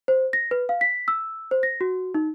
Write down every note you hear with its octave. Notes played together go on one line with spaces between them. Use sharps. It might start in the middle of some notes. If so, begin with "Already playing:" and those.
C5
A#6
B4
F5
B6
E6
C5
A#6
F#4
D#4